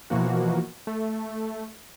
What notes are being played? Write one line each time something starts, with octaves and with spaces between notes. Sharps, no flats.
B2 E3 F3 A#3 F#4
A3